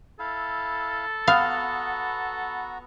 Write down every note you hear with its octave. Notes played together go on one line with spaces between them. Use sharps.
E4 A4 F5
B3 F#4 F5 A#5